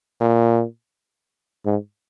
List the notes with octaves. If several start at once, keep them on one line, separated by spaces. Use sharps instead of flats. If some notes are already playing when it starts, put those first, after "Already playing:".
A#2
G#2